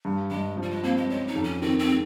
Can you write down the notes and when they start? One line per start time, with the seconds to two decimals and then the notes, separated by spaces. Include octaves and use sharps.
0.05 G2
0.31 G2 G#3
0.57 F3
0.62 G3
0.71 G#3
0.83 A#3 C4
0.97 G#3
1.09 G#3 C#4
1.27 D#4
1.35 F2
1.44 C#4
1.62 D#3 C4
1.79 C4
1.88 G#3